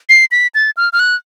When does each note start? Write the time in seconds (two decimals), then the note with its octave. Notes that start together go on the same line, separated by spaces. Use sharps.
0.09 C7
0.31 B6
0.55 A6
0.77 F6
0.93 F6
0.99 F#6